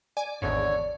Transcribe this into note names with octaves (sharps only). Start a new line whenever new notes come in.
D5 G#5
G#1 E2 G#2 D3 C#5